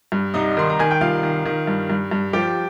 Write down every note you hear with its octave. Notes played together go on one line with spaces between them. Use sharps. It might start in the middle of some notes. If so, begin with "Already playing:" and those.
G2
C2 D#4 D#5
D#3 C6
A#5
D#3 G#5
G5
C2 F4 F5
D#3
D#3
G2
G2
G2
F3 G4 G5